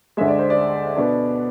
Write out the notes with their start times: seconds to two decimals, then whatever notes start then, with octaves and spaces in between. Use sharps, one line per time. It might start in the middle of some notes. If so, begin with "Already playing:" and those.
0.17 D2 D3 G#3 E5
0.28 D5
0.39 C5
0.50 D5
0.96 B2 B3 D4